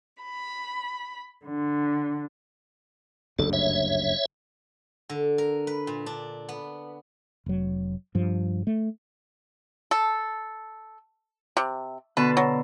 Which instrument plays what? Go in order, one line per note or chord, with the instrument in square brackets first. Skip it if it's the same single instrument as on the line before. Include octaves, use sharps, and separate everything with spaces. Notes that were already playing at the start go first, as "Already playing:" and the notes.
[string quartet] B5
D3
[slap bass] F#1 D2 G2 [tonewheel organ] A4
[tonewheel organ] C#5 E5
[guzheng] D3
A#4
B4
A#2
D4
B3
[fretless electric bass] F1 F#3
G2 F3
A3
[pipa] A4
C3
[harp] B2 D3 A5 [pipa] B4
[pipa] F#3